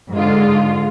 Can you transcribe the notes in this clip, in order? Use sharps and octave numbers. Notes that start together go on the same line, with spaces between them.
G#2 D3 G#3 F4